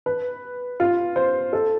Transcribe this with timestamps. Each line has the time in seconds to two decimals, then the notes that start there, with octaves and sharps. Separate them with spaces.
0.06 B4
0.80 F4
1.16 C5
1.53 A4